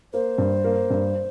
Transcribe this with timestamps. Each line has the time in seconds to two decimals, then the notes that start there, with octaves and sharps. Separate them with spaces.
0.13 A#3 C5
0.38 G2
0.64 A#3
0.90 G2